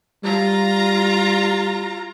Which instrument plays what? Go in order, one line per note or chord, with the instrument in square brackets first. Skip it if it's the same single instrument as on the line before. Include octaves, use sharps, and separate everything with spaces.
[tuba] G3 [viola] F4 A#5